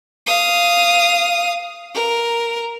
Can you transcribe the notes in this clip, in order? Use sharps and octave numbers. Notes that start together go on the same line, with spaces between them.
F5 D#6
A#4